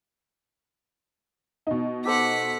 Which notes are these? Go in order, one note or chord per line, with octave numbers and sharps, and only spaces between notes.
B2 D#4
G4 A4 C5 F#5 B6